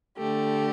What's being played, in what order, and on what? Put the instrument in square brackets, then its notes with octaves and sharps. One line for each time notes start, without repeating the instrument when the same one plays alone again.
[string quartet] D3 A3 G4